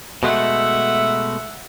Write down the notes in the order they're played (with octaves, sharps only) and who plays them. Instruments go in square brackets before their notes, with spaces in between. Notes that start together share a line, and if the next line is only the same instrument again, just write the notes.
[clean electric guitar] B2 G#3 A3 [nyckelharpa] E5 F#5